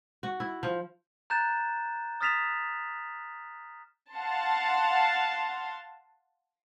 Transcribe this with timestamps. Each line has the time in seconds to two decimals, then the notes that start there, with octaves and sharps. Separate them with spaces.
0.23 F#4
0.40 E4
0.63 F3
1.30 A#5 F#6 G6 A6 E7
2.21 D#6 F6 A6 B6 E7 F7
4.13 F5 F#5 A5 C6